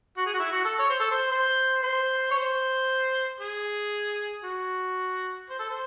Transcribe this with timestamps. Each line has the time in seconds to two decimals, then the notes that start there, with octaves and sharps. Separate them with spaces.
0.17 F#4
0.26 G#4
0.34 F#4
0.39 E4
0.52 F#4
0.65 A4
0.79 C#5
0.90 C5
1.00 A4
1.11 C5
1.31 C5
1.83 C5
2.31 C#5
2.36 C5
3.40 G#4
4.44 F#4
5.50 C5
5.59 A4
5.70 C5